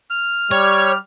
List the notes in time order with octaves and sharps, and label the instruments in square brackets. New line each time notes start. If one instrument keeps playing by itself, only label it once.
[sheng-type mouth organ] F6
[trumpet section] G3 [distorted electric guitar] C#5